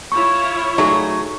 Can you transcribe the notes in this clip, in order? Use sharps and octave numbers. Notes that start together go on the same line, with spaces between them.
E4 F4 C#5 C#6
F#3 A3 D#4 G#4 C#6